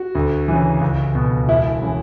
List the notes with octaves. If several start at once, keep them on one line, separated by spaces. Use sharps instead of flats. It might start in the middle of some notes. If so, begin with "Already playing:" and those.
Already playing: F#4
D2
C#3 E3
C#2
B2
E1 E4
C#3 E3